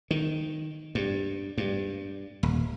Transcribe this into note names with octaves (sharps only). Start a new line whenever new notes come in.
D#3
G2
G2
D#1